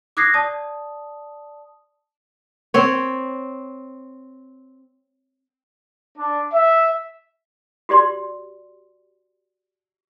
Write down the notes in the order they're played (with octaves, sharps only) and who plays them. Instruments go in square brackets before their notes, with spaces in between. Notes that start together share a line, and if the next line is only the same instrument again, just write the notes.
[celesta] D6 D#6 F#6 G#6 A#6 C7
D5 A5 D#6
[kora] C4 C#5
[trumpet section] D4
E5
[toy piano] F#4 G4 D5 C6